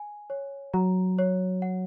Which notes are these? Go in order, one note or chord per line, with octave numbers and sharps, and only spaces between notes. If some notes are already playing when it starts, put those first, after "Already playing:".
Already playing: G#5
C#5
F#3 A#5
C#5
F#5